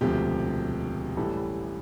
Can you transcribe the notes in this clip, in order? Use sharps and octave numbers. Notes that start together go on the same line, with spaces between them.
E1 D2 C3 F3 G4
A1 A2 E3 G3 A4